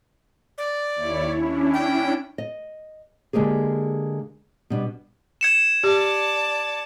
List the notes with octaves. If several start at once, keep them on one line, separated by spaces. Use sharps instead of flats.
D5
D#2 E4 C#5
C#4 D4 E4
G5
D#5
D3 G#3 A#3 G4 G#4
B2 G3 D4
G#6 C#7 E7
G4 D5 A5